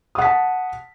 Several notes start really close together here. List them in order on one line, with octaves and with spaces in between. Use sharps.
D#6 F#5 B6 A5